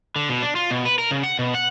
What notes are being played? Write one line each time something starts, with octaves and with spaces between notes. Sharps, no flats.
D3
B2
D4
F4
B2
B4
A#4
C#3
F#5
B2
F#5